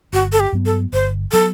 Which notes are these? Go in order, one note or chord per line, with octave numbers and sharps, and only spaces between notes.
G1 F#4
A4
G4
G2 F#3 B3
A4
G1 C5
F#3 B3 A4